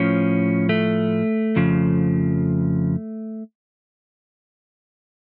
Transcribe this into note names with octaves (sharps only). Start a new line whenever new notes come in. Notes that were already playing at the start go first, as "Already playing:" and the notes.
Already playing: A2 F3 C#4
A3
F2 C#3 F3